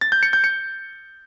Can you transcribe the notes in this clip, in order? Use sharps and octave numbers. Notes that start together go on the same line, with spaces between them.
A6
G6
C#7
G6
C#7